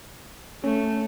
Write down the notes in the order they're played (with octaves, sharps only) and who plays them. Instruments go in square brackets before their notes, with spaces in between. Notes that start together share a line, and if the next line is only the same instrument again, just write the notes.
[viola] A3 [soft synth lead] C#4